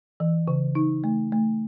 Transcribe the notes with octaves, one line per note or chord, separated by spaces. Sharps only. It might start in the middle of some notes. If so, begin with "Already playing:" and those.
E3
C#3
D#4
A3
A3